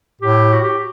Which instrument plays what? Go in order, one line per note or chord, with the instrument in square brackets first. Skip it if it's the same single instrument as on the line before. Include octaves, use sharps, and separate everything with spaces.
[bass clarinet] A2 [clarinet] G4
[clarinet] F#4
G4